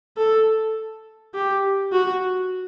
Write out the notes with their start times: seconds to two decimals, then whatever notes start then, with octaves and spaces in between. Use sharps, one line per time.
0.18 A4
1.35 G4
1.93 F#4